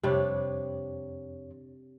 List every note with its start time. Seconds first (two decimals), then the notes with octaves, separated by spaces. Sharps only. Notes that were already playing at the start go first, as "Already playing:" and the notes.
0.03 F2 C3 G3 D4 C#5